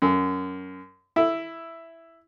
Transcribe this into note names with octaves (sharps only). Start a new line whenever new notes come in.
F#2
E4